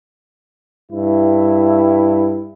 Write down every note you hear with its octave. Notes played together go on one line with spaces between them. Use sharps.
G2 E4